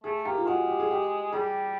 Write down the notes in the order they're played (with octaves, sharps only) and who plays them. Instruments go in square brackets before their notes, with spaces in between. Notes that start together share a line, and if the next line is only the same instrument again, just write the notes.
[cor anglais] A3 [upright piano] G#4
[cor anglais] A#3 [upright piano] G4
[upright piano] F4
[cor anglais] G#3 [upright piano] F#4
[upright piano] G4
G#4
G4
[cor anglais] G3 [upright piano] G#4